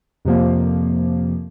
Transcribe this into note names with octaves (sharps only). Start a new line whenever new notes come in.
F2 C3 F3 A#3